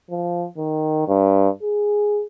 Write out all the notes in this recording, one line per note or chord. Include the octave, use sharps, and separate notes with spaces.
F3
D#3
G2
G#4